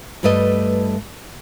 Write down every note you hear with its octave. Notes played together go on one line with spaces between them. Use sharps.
G2 G3 A3 B4 D#5